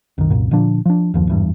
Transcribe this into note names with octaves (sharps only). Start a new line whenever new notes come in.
C2 F#2 D#3
C2 F#2 A#2
A#2 D3 F3 D4
F3 D4
F#1 D#2 F3
G#1 E2 G2